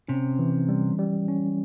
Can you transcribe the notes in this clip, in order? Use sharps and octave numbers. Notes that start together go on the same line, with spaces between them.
C3 C#4
E3
G3
G3
C#4